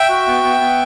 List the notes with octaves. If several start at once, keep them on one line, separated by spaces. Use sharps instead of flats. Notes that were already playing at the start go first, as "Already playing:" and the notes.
Already playing: E5 G5
F#4
B3
B3
B3